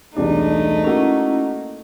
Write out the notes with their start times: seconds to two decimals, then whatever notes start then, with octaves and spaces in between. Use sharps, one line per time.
0.17 E1 C2 A3 D4 D#4
0.84 A#3 C#4 E4 F#4